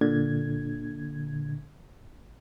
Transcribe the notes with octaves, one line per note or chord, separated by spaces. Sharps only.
A#2 D3 G#6